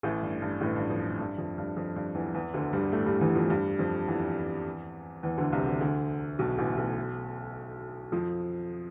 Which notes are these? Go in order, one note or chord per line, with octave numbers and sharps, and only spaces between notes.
A1 A2
G2
G2
A1 A2
G2
F2
G2
F2
G2
F2
G2
E2 E3
E2 E3
D2 D3
G2 G3
A2 A3
G2 G3
E2 E3
F2 F3
G2 G3
F2 F3
E2 E3
E2 E3
D2 D3
C2 C3
D2 D3
D2 D3
B1 B2
A1 A2
B1 B2
F2 F3